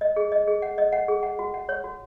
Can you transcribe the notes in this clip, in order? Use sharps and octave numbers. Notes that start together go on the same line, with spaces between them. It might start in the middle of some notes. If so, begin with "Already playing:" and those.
D#5
G#4
D#5
G#4
F#5
D#5
F#5
G#4
F#5
F#4
F#5
C#5
F#4